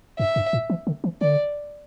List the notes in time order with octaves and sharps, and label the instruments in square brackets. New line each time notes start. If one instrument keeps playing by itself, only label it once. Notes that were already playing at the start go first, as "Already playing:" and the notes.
[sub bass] G2 [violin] E5
[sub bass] G2
A2
E3
D3
E3
[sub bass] D3 [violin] D5